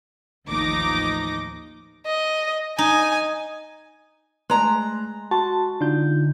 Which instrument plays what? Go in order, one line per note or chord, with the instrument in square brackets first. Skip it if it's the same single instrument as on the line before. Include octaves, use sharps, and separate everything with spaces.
[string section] A1 D#2 F3 D#4 D6 A#6
[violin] D#5
[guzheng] D#4 [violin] G#5
[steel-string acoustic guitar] G#3 A#5 [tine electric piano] A3 C6 F#6
[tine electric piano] F#4 C6 [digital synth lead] A5
[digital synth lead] D3 [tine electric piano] D#4 F4 G6